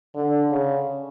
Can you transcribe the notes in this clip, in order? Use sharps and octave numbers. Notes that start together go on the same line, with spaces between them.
D3
C#3